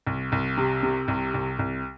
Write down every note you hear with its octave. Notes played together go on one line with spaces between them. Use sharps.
C2
C2
C3
C3
C2
C2
C2